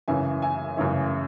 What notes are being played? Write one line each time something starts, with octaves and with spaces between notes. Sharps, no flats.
F#2 C#3 E3 E5 G#5
E5 G#5
F#2 C#3 E3 C#5 E5